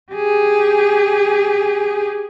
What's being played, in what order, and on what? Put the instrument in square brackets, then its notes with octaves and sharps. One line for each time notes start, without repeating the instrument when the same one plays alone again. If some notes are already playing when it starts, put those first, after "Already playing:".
[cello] G4 G#4